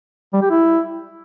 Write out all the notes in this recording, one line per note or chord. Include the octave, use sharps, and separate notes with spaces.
G3
G4
E4